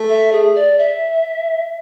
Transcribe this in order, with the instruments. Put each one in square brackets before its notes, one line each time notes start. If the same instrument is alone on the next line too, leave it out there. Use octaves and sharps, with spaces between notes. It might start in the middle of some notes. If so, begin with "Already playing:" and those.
Already playing: [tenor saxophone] A3
[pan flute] E5
G#4
D5
E5